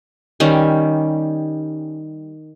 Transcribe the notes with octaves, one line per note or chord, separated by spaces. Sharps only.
D#3 G3 C#4